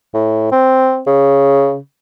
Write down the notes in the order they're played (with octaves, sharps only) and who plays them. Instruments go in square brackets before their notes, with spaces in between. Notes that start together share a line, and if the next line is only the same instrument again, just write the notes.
[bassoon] A2
C4
C#3